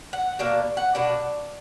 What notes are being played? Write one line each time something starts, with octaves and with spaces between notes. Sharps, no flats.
F#5
B2 A#3 D4 F5
F#5
B2 A#3 D4